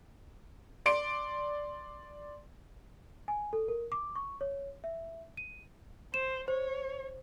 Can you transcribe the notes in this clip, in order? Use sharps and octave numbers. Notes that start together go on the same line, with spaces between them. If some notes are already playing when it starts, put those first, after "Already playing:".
D5 C6 D7
G#5
A4
A#4
D6
C#6
C#5
E5
D#7
C5 E7
C5 C#5